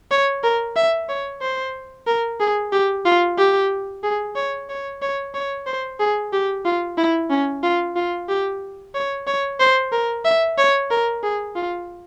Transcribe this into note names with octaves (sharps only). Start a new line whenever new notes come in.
C#5
A#4
E5
C#5
C5
A#4
G#4
G4
F4
G4
G#4
C#5
C#5
C#5
C#5
C5
G#4
G4
F4
E4
C#4
F4
F4
G4
C#5
C#5
C5
A#4
E5
C#5
A#4
G#4
F4